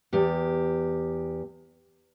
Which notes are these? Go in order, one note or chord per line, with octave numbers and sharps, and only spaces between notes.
E2 G4